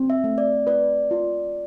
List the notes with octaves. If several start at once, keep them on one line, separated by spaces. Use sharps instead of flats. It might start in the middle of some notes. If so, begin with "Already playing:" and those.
Already playing: C4
E5
A3
D5
B4 D5
F4